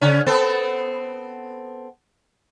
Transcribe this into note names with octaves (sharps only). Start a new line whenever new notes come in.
C#3 C#4
B3 C4 A4